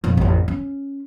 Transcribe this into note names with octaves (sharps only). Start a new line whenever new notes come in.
F2 A#2
A1 F2
C#4